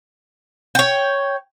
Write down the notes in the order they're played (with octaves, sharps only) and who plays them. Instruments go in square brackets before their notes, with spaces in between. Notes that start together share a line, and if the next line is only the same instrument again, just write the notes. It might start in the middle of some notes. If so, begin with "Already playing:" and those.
[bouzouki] C#5 G5